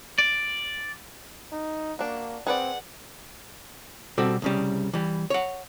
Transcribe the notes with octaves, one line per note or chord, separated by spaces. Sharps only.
D5
D#4
A#3 D4 F#4
C4 G#4 B4 D5 F#5
B2 G3 C4 F#4 A4
C2 C#3 G3
E3 G3
C#5 F#5